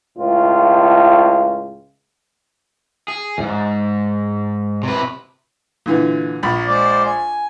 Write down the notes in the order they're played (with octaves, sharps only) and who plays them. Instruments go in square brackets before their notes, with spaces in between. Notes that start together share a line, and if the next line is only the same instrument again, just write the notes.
[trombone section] C#2 A2 F4
[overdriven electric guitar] G#4
D#2 G#2
C3 B4
[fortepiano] A#2 D3 E3
A#1 B5
[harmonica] G#3 C5 D5
G#5